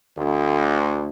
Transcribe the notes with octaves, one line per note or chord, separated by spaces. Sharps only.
D2